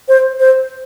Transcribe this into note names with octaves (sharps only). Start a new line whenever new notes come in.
C5
C5